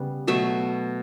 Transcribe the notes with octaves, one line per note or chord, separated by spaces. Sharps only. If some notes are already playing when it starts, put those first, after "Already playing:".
Already playing: C#3 G3 B3
B2 F#3 A3 E5